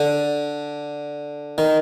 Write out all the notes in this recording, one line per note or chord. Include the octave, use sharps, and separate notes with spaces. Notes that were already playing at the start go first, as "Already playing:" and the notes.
Already playing: D3
D#3